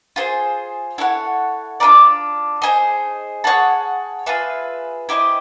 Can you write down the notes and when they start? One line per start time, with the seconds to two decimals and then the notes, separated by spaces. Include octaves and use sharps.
0.16 F4 G#4 C5
0.98 E4 A4 C#5 F#5
1.80 D4 F4 A#4 D5
2.62 D#4 G#4 C5
3.44 G#4 C#5 F#5 A5
4.26 F4 G#4 B4 E5
5.09 E4 G4 C5 D#5